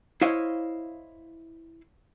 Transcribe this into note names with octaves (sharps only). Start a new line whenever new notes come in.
E4 C5 C#5 D#5 F5